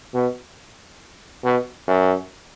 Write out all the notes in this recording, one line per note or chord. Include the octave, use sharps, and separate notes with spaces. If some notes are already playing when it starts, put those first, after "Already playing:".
B2
B2
F#2